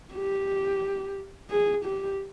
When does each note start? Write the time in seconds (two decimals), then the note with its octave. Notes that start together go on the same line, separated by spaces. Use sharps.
0.14 G4
1.50 G#4
1.85 G4